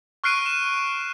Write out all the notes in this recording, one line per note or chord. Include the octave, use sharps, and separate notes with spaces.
C#6 F6 F#6 C7 D7 D#7
D#7 E7